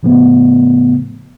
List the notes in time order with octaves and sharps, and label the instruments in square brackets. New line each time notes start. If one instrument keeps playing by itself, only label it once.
[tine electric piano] A2 C#3 F3 A3 B3